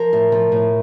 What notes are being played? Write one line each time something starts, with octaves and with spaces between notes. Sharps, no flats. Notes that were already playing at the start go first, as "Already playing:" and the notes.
Already playing: F3 A#4
A2
F3
A2